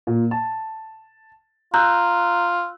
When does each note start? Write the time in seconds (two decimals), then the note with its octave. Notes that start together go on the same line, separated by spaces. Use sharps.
0.07 A#2
0.31 A5
1.74 F4 A#5 E6 F#6 G6